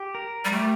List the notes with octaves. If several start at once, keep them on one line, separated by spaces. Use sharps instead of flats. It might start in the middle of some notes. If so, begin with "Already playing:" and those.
Already playing: G4
A#4
G3
A3 G4